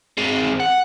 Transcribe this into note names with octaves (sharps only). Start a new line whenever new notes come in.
G#3 C4
F#5